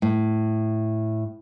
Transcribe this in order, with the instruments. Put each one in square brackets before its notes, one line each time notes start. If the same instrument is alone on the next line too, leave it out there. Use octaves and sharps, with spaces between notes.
[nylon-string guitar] A2